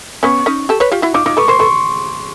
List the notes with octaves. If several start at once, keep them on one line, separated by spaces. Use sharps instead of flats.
B3 C#4 C#6
C#4 D#4
G4 A4
B4 C#5
F4 G4
E4 F#4
D#4 F4 D6
D#4 F4 D6
A4 B4 C#6
A#4 C5 C6
A4 B4 C#6